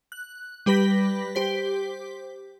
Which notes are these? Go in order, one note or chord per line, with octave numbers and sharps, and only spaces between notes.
F#6
G3 G4 B4 B5 A#6 B6
G4 C5 B6